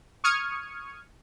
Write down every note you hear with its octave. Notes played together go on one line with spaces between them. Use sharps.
C#6 D#6 F6 G#6 C#7 D#7